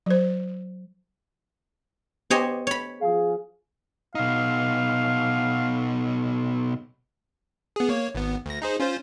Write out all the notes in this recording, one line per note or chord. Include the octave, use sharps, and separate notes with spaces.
F#3 C5
B3 G4 C5 C#5 D#5 G#5
C#5 B5
F3 G#4 F5
B2 D#4 F5
B3 G#4
A#3 C#5
G#1 B3
D2 A#6
D#4 G#4 C5
C#4 F4 C5